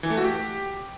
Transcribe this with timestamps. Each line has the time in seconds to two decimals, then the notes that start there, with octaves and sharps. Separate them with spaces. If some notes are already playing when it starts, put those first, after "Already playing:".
0.03 E3
0.10 A3
0.17 F#4
0.24 G4